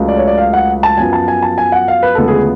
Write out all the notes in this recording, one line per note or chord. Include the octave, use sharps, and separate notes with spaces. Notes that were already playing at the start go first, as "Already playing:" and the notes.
Already playing: C#2 C#3 F#3 A3
D5
C#5
D5
F5
F#5
A5
F#2 F3 B3 G#5
A5
G#5
A5
G#5
F#5
F5
B4
D2 C#3 F3 G#3 B3 A4
G#4